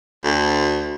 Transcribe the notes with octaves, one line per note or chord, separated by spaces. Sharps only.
D2